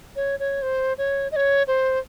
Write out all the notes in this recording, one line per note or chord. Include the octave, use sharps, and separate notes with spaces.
C#5
C#5
C5
C#5
D#5
C#5
C5